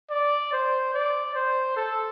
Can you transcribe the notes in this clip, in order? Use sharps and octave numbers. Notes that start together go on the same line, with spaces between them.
D5
C5
D5
C5
A4